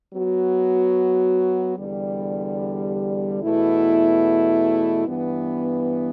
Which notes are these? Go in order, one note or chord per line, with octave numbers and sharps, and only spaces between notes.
F#3 B3 F#4
E2 D3 G3
E2 B2 A3 E4
G2 E3 B3